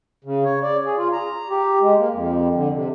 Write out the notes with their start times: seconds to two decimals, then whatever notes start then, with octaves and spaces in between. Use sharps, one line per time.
0.24 C#3
0.45 C#5
0.62 D5
0.85 G#4
0.97 F4
1.13 A#5
1.49 G4
1.81 G#3
1.98 A#3
2.12 F2
2.54 D3
2.73 C3